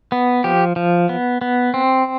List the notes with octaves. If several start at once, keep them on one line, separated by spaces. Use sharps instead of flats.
B3
F3 G4
F3
B3
B3
C4